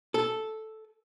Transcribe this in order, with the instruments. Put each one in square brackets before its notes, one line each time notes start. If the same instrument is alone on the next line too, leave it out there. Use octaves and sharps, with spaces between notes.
[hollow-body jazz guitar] A4